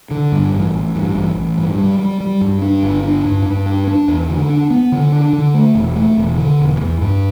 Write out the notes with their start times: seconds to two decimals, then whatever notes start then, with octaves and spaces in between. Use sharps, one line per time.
0.11 D3
0.32 G2
0.53 A1
0.74 A1
0.95 G2
1.15 A1
1.36 A1
1.57 G2
1.78 G3
1.99 G3
2.20 G3
2.41 G2
2.62 D4
2.83 G1
3.03 D4
3.25 G2
3.45 G2
3.66 D4
3.87 D4
4.08 E2
4.29 D3
4.49 D4
4.70 B3
4.92 D3
5.12 D4
5.33 D3
5.54 A3
5.75 E1
5.96 A3
6.17 E1
6.38 D3
6.59 E1
6.80 E2
7.01 G2